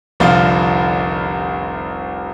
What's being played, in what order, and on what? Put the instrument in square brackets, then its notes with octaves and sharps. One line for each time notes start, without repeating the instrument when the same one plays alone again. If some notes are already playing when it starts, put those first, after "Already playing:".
[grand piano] F1 C2 D3 F3 F4